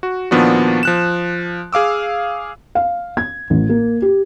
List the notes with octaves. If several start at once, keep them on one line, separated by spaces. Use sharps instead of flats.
F#4
A#2 D#3 F3 B3 D4 F#4
F3 F#6 E7
G#4 F5 D6 E6
F5
G#6
A1
A#3
G4